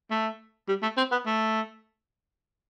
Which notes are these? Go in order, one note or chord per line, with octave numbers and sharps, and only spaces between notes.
A3
G3
A3
C4
B3
A3